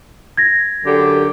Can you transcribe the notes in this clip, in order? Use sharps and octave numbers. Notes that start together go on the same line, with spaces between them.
G#6 A#6
F#2 D3 G4